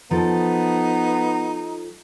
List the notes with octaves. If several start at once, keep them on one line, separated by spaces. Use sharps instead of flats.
F3 B3 D#4 A4